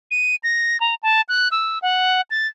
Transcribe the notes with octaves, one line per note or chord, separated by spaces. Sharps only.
D#7
A#6
A#5
A5
F#6
E6
F#5
A6